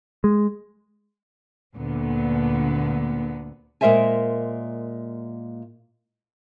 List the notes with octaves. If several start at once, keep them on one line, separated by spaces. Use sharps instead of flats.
G#3
D2 A#2 D3 B3
A#2 G#3 A#4 C5 E5 G#5